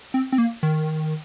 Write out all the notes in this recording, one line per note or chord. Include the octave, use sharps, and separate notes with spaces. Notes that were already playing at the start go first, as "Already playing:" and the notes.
C4
C4
A#3
D#3